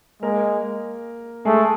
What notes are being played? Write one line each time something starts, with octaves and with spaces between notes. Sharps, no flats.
G#3 A#3 A#4
G#3 A3 G#4